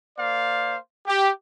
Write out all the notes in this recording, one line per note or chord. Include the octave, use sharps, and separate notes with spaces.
A#3 C5 D5 F5
G4